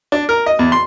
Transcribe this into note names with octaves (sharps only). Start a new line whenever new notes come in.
D4
A#4
D#5
E2
C6